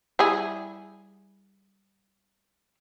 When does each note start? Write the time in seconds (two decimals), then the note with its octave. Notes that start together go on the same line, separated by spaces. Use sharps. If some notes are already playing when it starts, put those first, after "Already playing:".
0.19 G3 E4 G#4